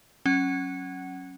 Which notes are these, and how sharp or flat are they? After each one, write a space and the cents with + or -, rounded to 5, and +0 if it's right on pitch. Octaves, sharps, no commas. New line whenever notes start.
F#3 +0 C#4 -20 F#5 +20